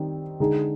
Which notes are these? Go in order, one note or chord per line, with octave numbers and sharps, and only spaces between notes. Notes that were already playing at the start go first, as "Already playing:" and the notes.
Already playing: D#3 G3 C4 D#4
D3 G#3 D#4 G#4